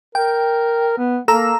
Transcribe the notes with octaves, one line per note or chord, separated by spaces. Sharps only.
A#4 G5
B3
A#3 A4 A#5 E6